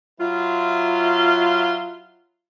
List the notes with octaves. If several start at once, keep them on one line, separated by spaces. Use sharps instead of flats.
F#3 E4 F4